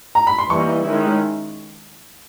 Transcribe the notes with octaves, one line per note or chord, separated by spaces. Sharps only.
A#5
B5
C6
E3 G3 A#3 D#4 C#6
D#3 G#3 C#4 E4